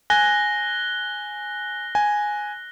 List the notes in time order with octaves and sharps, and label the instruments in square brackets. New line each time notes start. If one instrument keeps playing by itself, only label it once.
[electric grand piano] G#5 [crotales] F#6 A#6 G7
[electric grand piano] G#5